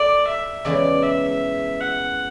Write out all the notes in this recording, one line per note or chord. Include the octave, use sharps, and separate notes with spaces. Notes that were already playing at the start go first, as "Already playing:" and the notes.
Already playing: A3 D5
E5
E2 C#3 E3 G#3 D5
E5
F#5